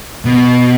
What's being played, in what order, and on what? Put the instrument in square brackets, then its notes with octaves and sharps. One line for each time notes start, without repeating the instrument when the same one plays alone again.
[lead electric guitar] B2